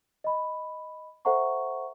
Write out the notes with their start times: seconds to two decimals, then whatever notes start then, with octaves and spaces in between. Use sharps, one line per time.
0.24 D#5 B5
1.25 A4 C5 E5 F#5 A#5 C#6